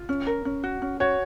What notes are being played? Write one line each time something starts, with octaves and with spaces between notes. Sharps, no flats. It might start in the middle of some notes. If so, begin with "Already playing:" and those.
Already playing: F4
C#4
A#4
C#4
F#4
C#4
F#4 C#5